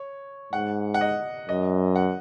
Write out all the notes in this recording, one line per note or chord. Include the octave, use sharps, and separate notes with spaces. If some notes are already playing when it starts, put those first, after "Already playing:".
Already playing: C#5
G#2 F#5
F#5
D#5
F#2 D#5
F#5